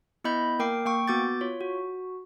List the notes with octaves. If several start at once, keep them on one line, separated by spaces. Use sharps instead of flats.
B3 E4 D#5 B5 G6
A#3 A#4 G5 D6 C7
A#3 G5 C#6
B3 F#4 D6 G6 A6
F4 C#5
F#4